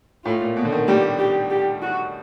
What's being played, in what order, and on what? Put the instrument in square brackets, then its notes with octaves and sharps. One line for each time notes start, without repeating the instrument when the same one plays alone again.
[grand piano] A2 [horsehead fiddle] F4
[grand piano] A#2
B2
D3
D#3
[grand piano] G3 [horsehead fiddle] G4
[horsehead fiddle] G4
G4
F#4